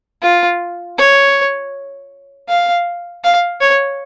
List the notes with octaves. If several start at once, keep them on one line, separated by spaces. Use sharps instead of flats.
F4
C#5
F5
F5
C#5